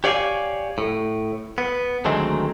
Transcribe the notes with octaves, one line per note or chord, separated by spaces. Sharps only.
G4 C#5 D5 F5 G5 G#5
A2
B3
D2 D#3 F#3 G#3 A3 C4